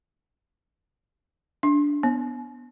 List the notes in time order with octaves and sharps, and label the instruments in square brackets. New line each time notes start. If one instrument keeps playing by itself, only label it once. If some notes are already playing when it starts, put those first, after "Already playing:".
[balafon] D4
B3